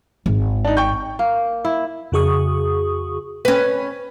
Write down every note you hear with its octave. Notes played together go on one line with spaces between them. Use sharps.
G#1
D4 D#4
G5 C#6 G6
A#3
E4
F2 C#3 F#4 G#4 C#6 D#6
C#4 B4